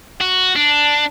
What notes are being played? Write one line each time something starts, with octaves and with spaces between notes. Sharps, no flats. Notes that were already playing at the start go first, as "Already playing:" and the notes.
F#4
D4